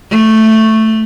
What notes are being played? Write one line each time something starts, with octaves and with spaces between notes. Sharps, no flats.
A3